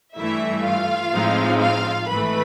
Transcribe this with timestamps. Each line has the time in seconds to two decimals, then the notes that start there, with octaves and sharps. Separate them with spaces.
0.17 G2 E3 A3 E4 E5
0.64 F4 F5
1.12 A2 F3 G#3 C4 D#4
1.60 F4 F5
2.08 G#1 G#2 E3 A3 B4 B5